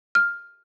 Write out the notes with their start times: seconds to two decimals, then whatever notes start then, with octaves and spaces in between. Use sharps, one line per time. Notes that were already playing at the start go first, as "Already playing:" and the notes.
0.15 F6